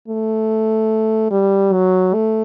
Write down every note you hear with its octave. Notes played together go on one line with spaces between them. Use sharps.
A3
G3
F#3
A3